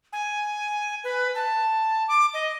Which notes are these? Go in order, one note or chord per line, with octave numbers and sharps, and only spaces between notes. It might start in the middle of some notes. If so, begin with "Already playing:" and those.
G#5
B4
A5
D6
D#5